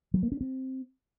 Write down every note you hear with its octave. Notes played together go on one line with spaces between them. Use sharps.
F#3
A#3
C#4
C4